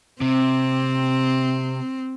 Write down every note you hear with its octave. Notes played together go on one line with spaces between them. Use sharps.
C3 C4